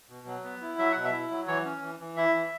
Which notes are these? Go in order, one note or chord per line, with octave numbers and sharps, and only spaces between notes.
B2
F#3
B3
E4
F#3 E5
B2 F#5
E5
E4
F#3
E3 C#5
C#4
E3
E3
E4 E5
E3